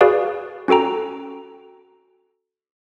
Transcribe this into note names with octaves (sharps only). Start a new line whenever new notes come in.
F#4 G#4 B4 D5 F5
C#4 F#4 A4 G5 A#5